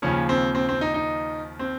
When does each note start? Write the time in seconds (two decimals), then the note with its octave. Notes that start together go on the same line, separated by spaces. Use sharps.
0.02 D#2 C#3 F3 C#4
0.29 C4
0.55 C4
0.69 C4
0.81 D#4
0.94 D#4
1.59 C4